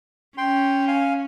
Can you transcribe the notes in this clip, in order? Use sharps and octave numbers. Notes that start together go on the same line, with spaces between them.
C#4 G5 C6
F5 G#5